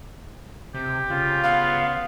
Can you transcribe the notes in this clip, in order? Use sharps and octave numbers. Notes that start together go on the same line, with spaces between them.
C3 G4
C#3 F4
B3 F5